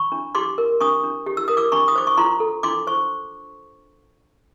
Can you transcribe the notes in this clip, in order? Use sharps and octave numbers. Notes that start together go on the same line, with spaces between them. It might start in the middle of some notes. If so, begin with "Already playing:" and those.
Already playing: B5 C#6
D4
G4 C6 D6
A#4
D4 C#6 D#6
D4
G4
E6
A#4 D#6
D6 E6
D4 B5 C#6
D#6
C5 D6
C#6
F4 A#5 C6
A4
D4 C6 D6
C5 C#6